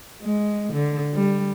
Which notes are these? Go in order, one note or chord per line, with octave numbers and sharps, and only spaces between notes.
G#3
D3
G3